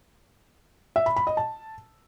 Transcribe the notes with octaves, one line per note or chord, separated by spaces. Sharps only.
E5
B5
B5
D#5
A5